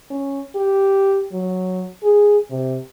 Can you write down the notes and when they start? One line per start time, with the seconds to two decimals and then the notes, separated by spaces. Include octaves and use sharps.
0.10 C#4
0.55 G4
1.32 F#3
2.03 G#4
2.50 C3